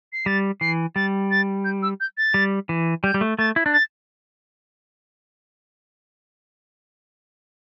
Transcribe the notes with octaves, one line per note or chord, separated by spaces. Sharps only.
C7
G3 A6
E3 C7
G3 A6
A6
G6
E6
G6
A6
G3
E3
G3 G6
G3
A3
A3 A6
E4
D4
A6